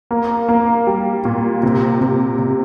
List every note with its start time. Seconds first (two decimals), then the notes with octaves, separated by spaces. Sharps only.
0.11 A#3
0.49 A#3
0.87 G3
1.25 A#2
1.63 C3
2.01 C3
2.39 C3